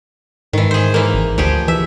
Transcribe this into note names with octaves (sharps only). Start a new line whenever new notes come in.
G#2 D#3 E3
G#4 C5
E3 A#3
G#1
D2 F3 G4 G#4
E3 E5